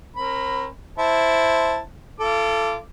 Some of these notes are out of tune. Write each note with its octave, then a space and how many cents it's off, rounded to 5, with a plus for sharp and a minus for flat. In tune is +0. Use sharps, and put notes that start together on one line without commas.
C4 +40 A#4 +0 B5 +15
E4 +0 C5 +0 A5 +0
F4 -35 A4 +0 D6 -15